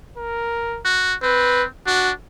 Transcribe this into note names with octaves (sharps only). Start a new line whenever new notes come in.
A#4
F#4
C4 B4
D4 F#4